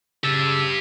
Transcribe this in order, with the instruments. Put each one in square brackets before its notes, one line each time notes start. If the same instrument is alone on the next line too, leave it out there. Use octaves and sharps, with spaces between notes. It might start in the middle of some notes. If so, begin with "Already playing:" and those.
[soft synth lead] C#3 [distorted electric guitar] G4 A5 [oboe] E6